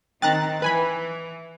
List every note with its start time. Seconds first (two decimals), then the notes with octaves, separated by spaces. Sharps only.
0.22 D#3 C4 D#4 G5 A#5 F#6 A6
0.62 E3 B4 G#5 B5